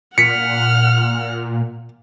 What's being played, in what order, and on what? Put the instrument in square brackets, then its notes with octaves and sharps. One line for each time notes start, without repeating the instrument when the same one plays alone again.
[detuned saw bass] A#2 [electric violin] F#5 F6 [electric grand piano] B6 C#7